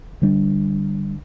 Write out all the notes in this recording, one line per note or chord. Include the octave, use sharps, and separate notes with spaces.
D3 G3 D4